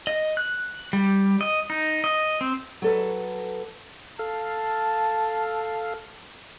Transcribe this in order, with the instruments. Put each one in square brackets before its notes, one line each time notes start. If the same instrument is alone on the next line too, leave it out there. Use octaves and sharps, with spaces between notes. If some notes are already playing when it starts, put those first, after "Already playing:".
[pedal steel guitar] D#5
F#6
G3
D#5
D#4
D#5
C4
[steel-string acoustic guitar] F#3 A4 B4
[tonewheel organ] A4 F5 [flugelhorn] A5